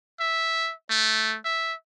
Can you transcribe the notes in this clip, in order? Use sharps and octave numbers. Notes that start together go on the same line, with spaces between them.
E5
A3
E5